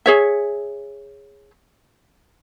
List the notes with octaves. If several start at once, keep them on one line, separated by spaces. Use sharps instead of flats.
G#4 C#5 E5